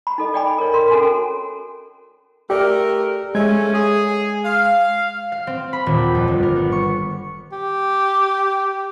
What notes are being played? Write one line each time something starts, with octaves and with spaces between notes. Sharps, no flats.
B5
D#4 A4 D#5
D5 D#5 G5 G#5 B5 D6
A#4 C#5
A#4 C6
C#4 F#4 A4 A#4 G#5
A3 G4 A#4 D5
G#3 A3 C#4 G#6
G#4
F5
F5
C4
B5
D#1
G6
F2
G1
A#4
B3
C#6
G4